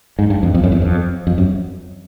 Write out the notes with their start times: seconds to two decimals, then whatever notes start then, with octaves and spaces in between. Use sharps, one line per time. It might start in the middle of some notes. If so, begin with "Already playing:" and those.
0.19 G#2
0.30 G2
0.43 F2
0.54 F2
0.63 F#2
0.72 E2
0.82 F2
1.27 F2
1.38 F#2